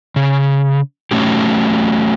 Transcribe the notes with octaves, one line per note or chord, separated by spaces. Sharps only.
C#3
F#3 A3 C#4 G4